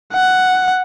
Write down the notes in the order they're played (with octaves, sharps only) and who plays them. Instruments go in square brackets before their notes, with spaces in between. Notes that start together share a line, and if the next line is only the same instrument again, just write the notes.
[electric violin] F#5